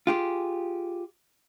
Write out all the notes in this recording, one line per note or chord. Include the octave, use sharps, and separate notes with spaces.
F4 G4 G#4